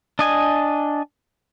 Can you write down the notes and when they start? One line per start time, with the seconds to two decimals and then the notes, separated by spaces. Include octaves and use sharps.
0.19 D4 D#5 G#5